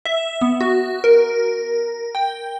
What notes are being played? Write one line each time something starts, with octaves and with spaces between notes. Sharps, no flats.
E5
B3
F#4
A#4
G5